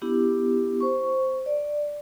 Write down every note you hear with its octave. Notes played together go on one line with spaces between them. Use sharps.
B3 D4 E4 G4
C5 C#6
D5